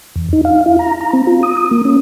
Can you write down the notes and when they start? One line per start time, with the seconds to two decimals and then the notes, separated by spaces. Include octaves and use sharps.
0.16 E2
0.33 D#4
0.45 F5
0.66 E4
0.79 A#5
1.01 A#5
1.13 C4
1.27 F4
1.43 D#6
1.57 D#6
1.71 A#3
1.85 C#4